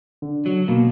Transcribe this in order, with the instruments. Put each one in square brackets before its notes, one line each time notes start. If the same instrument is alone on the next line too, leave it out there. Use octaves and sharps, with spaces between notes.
[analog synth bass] D3
[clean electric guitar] F#3
[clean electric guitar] B2 [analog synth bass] A#3